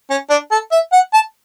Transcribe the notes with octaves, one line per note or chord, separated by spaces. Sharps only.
C#4
D4
A4
E5
F#5
A5